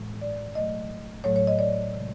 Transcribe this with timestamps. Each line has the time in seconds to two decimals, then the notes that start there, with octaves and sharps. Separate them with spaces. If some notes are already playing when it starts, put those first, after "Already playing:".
Already playing: A2 E3 G#3
0.21 D5
0.55 B2 F#3 A3 D#5
1.24 A2 F#3 A3 C#5
1.36 C#5
1.47 D#5
1.59 D5
1.93 C3 D#3 G#3